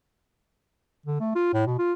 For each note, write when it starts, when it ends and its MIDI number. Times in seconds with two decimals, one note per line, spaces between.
1.06 1.20 50
1.20 1.35 57
1.35 1.52 65
1.54 1.65 45
1.66 1.78 47
1.79 1.93 65